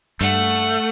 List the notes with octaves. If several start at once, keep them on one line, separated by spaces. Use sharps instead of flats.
G2 A3 F#5